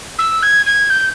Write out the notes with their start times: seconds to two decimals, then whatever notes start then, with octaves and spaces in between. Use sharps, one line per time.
0.19 E6
0.42 G#6
0.66 G#6
0.90 G6